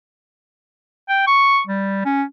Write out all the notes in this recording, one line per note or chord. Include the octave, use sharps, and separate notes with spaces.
G5
C#6
G3
C#4